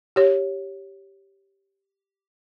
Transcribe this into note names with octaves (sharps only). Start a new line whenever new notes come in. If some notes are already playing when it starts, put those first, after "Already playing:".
G4 C#5